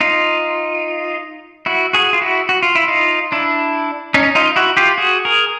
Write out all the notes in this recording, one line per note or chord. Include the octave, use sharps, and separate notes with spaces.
D#4 F4
E4 F#4
F#4 G#4
F4
E4 F#4
F#4
F4
E4
D#4 F4
D4 E4
C#4 D#4
D#4 F4
E4 F#4
F4 G4
F#4 G#4
G#4 A#4